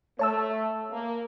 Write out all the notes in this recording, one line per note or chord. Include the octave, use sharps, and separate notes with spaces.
A3 C#5 A5 E6
A#3